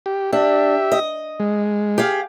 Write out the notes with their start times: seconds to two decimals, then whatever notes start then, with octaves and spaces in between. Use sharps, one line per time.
0.06 G4
0.33 D4 G4 E5
0.92 D#5
1.40 G#3
1.98 G4 G#4 F5